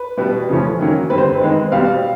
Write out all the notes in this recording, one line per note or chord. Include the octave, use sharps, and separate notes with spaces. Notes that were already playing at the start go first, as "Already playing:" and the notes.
Already playing: B4
B2 G3 B3
C#3 F3 A3 C#4
D#3 F#3 A#3 C#4
D3 G3 C4 B4
C5
B4
D#3 G#3 C4
B2 G3 C4 F5